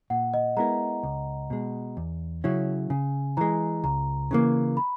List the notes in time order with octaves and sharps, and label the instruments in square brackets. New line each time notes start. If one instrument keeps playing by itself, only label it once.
[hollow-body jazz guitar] A#2 [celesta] F#5
[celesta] D#5
[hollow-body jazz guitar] G#3 B3 E4 A#4 [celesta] A#5
[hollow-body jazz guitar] C#2
B2 G#3
E2
C#3 F#3 C#4 E4
[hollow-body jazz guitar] C#3 [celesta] G#5
[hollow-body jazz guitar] E3 G#3 [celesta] A#5
[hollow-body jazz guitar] C#2 [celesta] A#5
[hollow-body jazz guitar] C#3 E3 A#3
[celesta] B5